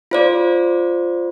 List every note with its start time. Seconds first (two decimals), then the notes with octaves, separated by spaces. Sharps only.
0.11 F4 C5 D5